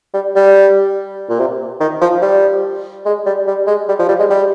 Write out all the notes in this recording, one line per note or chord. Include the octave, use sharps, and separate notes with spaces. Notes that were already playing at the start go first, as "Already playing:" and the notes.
G3
G3
A#2
C3
D#3
F3
G3
G#3
G3
G3
G#3
G3
F3
G3
G#3
G3